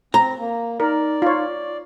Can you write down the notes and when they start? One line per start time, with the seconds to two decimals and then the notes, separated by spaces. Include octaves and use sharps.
0.14 C4 A#5
0.38 A#3
0.80 D#4 A#4 D5
1.22 F4 C#5